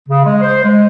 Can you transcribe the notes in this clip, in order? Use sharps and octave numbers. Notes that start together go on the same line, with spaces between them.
C#3
G#3
C5
G#3